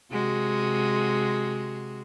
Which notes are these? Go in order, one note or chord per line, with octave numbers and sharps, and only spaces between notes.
C3 G#3 F#4